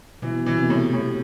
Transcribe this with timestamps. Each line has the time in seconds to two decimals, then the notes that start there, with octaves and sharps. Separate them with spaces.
0.22 B2 E3
0.46 B2 E3
0.58 C3
0.69 A2 C3
0.93 A2